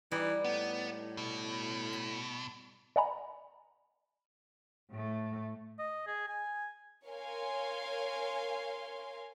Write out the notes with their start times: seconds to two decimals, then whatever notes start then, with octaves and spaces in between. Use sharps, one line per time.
0.11 E3 G3 D#4
0.44 A2 B3
1.17 B2
1.93 B5
2.96 D5 D#5 F#5 G#5 A#5 B5
4.92 A2 A3
5.79 D#5
6.07 G#4
6.28 G#5
7.07 A#4 C#5 F5 G#5 C6